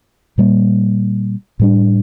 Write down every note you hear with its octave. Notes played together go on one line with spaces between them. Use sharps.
A#2 G3 A#3
A2 G3 D4